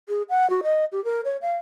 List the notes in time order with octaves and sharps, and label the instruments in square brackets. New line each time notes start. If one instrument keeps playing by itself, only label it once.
[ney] G#4
F#5
F#4
D#5
G4
A#4
C#5
F5